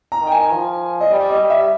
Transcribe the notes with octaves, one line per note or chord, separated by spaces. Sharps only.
A#5
D#3
G5
G#5
F3
D#5
G3 D5
D#5
G3
E5